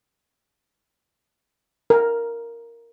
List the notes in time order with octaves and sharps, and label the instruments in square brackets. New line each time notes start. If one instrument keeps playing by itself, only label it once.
[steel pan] A#4